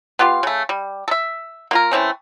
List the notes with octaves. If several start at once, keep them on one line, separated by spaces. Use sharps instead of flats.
B3 F4 G4 F5
C#3 A3
G3
A4 E5
A#3 F4 A#4
E3 A3 C4 C#4